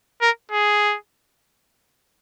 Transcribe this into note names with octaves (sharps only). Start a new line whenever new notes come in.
A#4
G#4